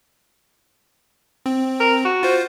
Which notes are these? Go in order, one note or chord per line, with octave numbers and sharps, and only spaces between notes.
C4
A#4
F#4
F4 C5